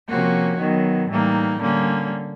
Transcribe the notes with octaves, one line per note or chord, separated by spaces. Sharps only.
C3 F3 A#3 C#4 F#4
D#3 F#3 B3
A2 E3 G3 A#3 D#4
D3 G3 A#3 C#4